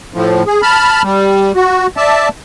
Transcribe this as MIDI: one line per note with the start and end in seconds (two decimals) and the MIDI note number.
0.14 0.43 45
0.14 0.43 53
0.47 0.61 68
0.62 1.02 81
0.62 1.02 83
0.62 1.02 89
1.03 1.52 55
1.56 1.87 66
1.97 2.29 74
1.97 2.29 76
1.97 2.29 81